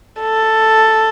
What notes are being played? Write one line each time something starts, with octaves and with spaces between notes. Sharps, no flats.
A4